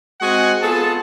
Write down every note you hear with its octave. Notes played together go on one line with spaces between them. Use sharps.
G#3 C4 F#4 D#5 F#5 G#5
B3 F4 G#4 A4 A5